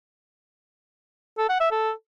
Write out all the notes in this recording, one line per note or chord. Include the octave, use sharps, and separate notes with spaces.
A4
F#5
E5
A4